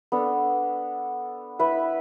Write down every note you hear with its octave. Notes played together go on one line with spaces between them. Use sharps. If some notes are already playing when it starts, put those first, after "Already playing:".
B3 D4 A4
E4 B4 E5